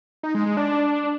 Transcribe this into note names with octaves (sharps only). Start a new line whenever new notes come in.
D#4
G#3
G#3
D4